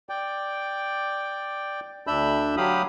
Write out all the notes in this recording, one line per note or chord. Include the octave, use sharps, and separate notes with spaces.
D5 G5
D2 D4 E5 B5 E6 G6
F#3 G4 F5 B5 D#6